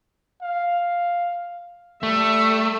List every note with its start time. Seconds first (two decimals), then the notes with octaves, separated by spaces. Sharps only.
0.42 F5
2.03 G3 A3 E5